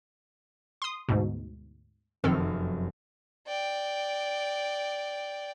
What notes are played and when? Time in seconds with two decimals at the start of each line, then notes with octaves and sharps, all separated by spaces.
0.82 C6 D#6
1.09 D2 G#2 B2
2.24 F1 F#2 D#3 C4 A4 F6
3.47 D5 G5